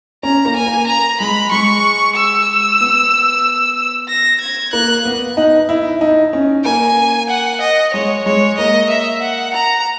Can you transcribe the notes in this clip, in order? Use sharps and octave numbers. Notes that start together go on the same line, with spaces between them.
C#4 A#5
A#3
G#5
A#3
A#5
G#3 B5
G#3 C#6
E6
B3
A#6
G#6
A#3 F#6
B3
D#4
E4
D#4
C#4
A#3 G#5
F#5
D#5
G#3 C#5
G#3 C#5
A#3 D#5
E5
F#5
A#5